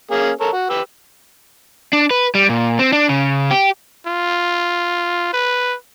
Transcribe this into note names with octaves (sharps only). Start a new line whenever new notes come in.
A#3 C#4 G#4
A4 A#4 C#5
F#4
G4 B4 E6
D4
B4
G3
A#2
C4
D4
C#3
G4
F4
B4